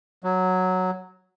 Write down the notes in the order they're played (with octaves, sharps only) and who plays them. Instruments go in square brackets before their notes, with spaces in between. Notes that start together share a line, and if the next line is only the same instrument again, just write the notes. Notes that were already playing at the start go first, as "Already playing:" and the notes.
[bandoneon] F#3